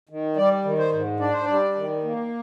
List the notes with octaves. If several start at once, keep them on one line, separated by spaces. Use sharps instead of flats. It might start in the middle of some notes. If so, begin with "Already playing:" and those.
D#3
G3 D5
D#3
C5
G#2
D4 D5
C5
G3 D5
D#3
A#3